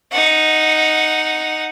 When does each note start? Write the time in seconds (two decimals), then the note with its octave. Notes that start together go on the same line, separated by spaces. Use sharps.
0.12 D#4 F#5